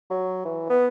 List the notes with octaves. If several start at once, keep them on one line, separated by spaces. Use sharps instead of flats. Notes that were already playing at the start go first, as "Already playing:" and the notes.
F#3
E3
B3